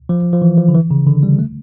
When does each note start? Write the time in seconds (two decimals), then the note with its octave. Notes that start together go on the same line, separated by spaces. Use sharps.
0.09 F3
0.33 F3
0.42 E3
0.58 F3
0.68 D3
0.74 E3
0.91 C#3
1.07 D3
1.23 G3
1.39 A3